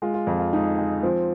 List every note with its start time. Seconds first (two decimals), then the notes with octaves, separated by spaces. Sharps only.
0.02 G#3 F4
0.14 F4
0.27 F2 F4
0.39 F4
0.53 G#3 D#4
0.78 G#3
1.03 F3 C4